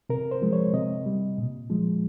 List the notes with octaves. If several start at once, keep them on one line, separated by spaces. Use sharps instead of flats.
C3 A#4
C5
F3 G#3
C#5
C3 D#5
G3
A#2
F3 G#3